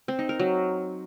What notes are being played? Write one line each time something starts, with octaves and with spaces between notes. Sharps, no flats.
C4
D#4
A#4
F#3